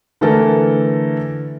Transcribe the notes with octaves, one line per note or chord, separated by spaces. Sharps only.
D3 E3 A3 A4 A#4